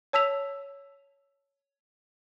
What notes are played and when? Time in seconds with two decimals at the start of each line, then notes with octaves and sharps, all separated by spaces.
0.13 C#5 A5 E6 B6 F7